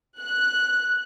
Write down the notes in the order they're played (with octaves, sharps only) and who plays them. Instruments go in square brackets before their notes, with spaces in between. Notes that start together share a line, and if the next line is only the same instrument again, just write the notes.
[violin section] F#6